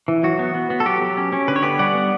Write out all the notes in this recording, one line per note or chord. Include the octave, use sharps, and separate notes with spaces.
E3
F#3 F#4
B3
B3
B3
A4
F#3 G4
F#3
C#4
C#4
D3 B4
C#5
B3 G4 B4
G3 D5 F#5
B3